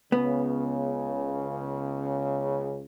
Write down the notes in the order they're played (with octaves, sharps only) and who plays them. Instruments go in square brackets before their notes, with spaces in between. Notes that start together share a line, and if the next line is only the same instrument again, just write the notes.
[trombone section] C#2 C#3 [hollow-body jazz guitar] B3